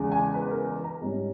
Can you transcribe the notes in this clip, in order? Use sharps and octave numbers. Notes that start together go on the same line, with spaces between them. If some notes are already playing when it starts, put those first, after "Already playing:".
Already playing: E2 C#3 G#3
G#5
B4
A#4
B4
A#5
G#2 G3 C#4